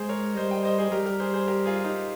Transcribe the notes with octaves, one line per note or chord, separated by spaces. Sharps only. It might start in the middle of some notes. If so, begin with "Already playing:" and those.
Already playing: G#3 G#4 C5
A#4 C#5
G3 C5 D#5
D#5 G5
C5 D#5
G#4 C5
G3 G4 A#4
G4 A#4
G#4 C5
G#4 C5
G4 A#4
F4 G#4
D#4 G4